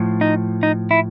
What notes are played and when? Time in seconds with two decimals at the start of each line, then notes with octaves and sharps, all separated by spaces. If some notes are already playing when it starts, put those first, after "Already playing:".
Already playing: A2 F3
0.21 D#4
0.63 D#4
0.91 E4